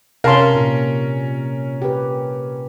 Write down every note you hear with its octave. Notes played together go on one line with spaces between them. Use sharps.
C3 C#4 A#4 F5 A5 C6
A#2
G4 B4